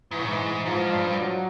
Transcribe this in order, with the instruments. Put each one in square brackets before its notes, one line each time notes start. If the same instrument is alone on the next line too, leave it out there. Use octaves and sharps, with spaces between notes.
[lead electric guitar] G#2 [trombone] E3
[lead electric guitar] A2
G#2
[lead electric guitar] G#2 [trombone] F3
[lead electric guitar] G2
[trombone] F#3